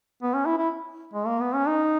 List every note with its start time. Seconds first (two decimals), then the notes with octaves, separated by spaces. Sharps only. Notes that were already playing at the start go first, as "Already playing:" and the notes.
0.23 B3
0.34 C#4
0.46 E4
0.58 E4
1.13 G#3
1.27 A#3
1.41 B3
1.54 C#4
1.68 D#4